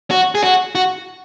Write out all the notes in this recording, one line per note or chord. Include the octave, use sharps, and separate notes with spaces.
F#4
G#4
F#4
F#4